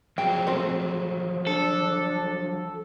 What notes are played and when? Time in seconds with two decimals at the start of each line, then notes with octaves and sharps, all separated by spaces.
0.18 F3 F#3 G#4 G5
0.47 A3 C4
1.47 D4 A4